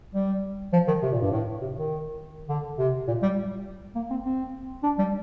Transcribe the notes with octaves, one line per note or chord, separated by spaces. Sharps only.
G3
F3
D#3
C3
A#2
G2
A2
C3
D#3
D3
C3
A#2
G3
A#3
C4
C4
D4
G3